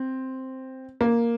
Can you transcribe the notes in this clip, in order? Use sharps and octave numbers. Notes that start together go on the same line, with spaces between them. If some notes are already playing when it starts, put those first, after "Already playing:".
Already playing: C4
A#3